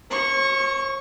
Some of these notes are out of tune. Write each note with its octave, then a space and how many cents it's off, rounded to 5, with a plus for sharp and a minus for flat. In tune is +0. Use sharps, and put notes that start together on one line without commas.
C#5 -45 C#6 +0